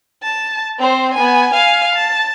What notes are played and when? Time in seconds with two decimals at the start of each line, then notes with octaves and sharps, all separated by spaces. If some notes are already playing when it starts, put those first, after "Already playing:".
0.23 A5
0.79 C4 C5
1.14 B3 G#5
1.53 F5 G#5
1.95 A5